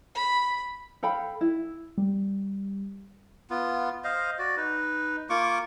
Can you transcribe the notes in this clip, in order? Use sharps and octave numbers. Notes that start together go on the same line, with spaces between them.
B5
A4 F5 G5 B5
E4
G3
B3 F4
C5 D#5 F5
F#4 D5
D#4 B4
A#3 F4 C#6 D6